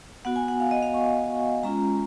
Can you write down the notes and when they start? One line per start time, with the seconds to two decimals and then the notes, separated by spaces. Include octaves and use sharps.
0.25 B3 F#4 F#5
0.36 G#5
0.48 F#5
0.60 F5
0.71 D#5
0.82 F5
0.94 C#6
1.63 G#3 C#4 F4 A#5